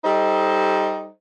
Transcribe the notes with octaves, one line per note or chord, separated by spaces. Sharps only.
G3 D#4 A4 C5 D#5